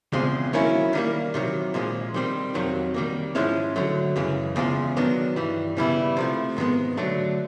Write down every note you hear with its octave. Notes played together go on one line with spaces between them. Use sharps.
E2 C#3 F3 G#3 C4
D#3 F#3 A#3 C#4 E4
D#3 G3 A#3
C3 D#3 F#3
A#2 F3 G#3
D#3 G3 C4
F2 C3 D#3 F#3
D#3 G3 A#3
G#2 F3 G#3 C#4 E4
D3 F#3 A3
F#2 C#3 E3 G#3
E2 C#3 F3 G#3
D#3 F#3 B3 D4
G2 E3 G3
C#3 E3 G3 B3 E4
C3 F3 A3
G#2 D#3 G#3 B3
D3 F#3 A3 D4